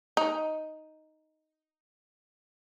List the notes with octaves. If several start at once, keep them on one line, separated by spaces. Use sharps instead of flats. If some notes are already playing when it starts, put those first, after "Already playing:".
D#4